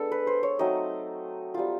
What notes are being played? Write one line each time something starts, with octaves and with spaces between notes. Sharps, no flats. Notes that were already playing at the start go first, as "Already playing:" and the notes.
Already playing: G#3 B3 D4 A4
B4
C5
C#5
F#3 A3 C4 D#4 D#5
G3 C4 F4